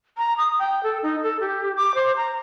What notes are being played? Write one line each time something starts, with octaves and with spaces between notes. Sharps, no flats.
A#5
D#6
G5
A4
D#4
A4
G4
D6
C5
A#5